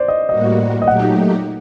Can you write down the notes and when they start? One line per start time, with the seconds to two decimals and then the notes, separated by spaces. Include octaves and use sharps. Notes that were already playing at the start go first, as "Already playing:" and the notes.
Already playing: C5 D5
0.08 D#5
0.28 A2 G3 A#3 F#4 D#5
0.82 D#5
0.86 A#2 F#3 A3 D#4 G4 F#5